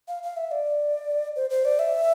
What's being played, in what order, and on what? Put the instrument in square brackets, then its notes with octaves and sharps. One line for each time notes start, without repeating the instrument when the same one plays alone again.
[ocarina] F5
F5
E5
D5
C5
C5
D5
E5